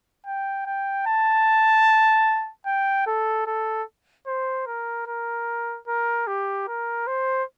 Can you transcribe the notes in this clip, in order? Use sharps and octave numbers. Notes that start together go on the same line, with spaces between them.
G5
G5
A5
G5
A4
A4
C5
A#4
A#4
A#4
G4
A#4
C5